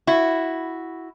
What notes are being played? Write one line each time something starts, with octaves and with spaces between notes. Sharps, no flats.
E4 F#4